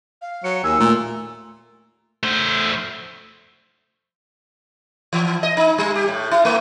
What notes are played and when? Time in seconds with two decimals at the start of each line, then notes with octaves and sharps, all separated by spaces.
0.22 F5
0.44 F#3 C#7
0.64 D#2 G#5 E6
0.80 A#2 A3
2.23 A3 C5
5.13 E3
5.43 D#5
5.57 D#4
5.78 G3
5.95 G4
6.08 A2
6.31 E4
6.45 A3